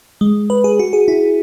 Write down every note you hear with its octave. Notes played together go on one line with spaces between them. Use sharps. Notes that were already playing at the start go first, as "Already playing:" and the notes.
G#3
B4
G#4
F#4
G#4
E4